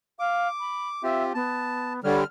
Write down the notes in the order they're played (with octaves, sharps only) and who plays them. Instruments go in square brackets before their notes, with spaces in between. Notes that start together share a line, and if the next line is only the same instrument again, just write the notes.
[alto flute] F5 [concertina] D6
[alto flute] B5
[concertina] C4 F4 G4 [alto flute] E5
[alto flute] B3 [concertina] A5
[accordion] D3 G3 [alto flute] C#5 [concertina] F6